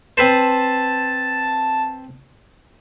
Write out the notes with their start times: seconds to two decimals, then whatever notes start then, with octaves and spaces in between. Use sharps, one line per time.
0.17 C4 B4 C5 A5